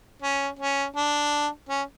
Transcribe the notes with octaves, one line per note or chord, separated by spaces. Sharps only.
C#4
C#4
D4
C#4